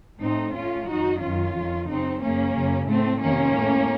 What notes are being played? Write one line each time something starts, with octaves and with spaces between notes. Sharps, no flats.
A2 C4 D#4
A2 C#4 F4
F#2 D#3 D#4 F#4
F#2 D#3 C#4 F4
F2 D#3
F#2 C#3 C4 D#4
F#2 C#3 A#3 C#4
F#2 C#3
A2 A3 C4
F2 C3 D#3 A#3 C#4
A2